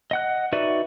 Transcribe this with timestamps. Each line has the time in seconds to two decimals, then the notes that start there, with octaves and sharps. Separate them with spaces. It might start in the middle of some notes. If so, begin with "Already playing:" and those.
0.11 D#5 F#5 F#6
0.52 D#4 F#4 B4 D5 E5